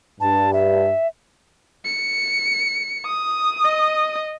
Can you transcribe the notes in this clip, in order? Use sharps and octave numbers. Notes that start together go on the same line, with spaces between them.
G2 A5
E5
C#7
D#6
D#5